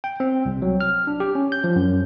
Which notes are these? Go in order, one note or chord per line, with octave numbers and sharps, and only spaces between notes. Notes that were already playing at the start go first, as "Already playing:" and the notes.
G5
C4
C2
F#3
F6
D4
G4
C#4
G6
F3
F#2